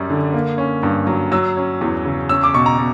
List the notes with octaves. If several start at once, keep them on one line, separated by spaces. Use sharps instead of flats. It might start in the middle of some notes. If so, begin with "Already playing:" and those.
Already playing: F#2 G3 C#4
D3
A#3
C#4
G2
F#3
F#3 E6
C#4
E2
C#3
C#4 E6
D6
B2 C#6
A#5
B2